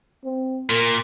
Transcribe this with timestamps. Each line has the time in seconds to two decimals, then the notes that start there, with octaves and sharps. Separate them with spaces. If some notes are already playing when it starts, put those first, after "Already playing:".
0.24 C4
0.70 A#2 A#4